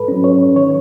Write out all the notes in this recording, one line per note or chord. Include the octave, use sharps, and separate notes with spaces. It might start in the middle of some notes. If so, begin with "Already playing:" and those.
Already playing: G#2 A4 B4
F#3 C#4
C#5
D#3 C#5